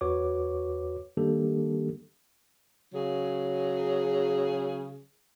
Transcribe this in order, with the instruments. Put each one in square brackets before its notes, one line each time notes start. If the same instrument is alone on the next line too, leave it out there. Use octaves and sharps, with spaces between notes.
[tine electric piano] E2 F#4 B4 C#5 D6
D#3 G3 A#3 D4 G4 A4
[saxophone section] C#3 F#3 G#4